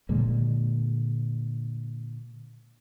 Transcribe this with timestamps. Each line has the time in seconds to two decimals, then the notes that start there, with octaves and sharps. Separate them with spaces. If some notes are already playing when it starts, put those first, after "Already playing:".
0.09 A#2 D3 G#3 A#3